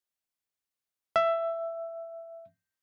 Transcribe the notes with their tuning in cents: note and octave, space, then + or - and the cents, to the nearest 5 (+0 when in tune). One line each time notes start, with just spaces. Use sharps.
E5 +15